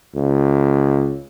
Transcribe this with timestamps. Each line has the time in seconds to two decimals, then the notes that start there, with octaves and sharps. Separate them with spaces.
0.15 C#2